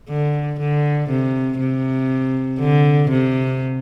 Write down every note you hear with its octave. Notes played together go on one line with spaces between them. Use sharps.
D3
D3
C3
C3
D3
C3